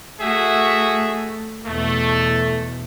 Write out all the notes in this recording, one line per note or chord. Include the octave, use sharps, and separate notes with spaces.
A3 F#4 G#4 E5
E2 B2 A3